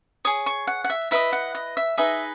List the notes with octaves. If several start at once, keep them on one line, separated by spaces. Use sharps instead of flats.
G#4 C#5 D#6
C#6
F#5
F#5
E5
E4 B4 D#5 E5
F#5
D#5
E5
D#4 G#4 B4 D#5 E5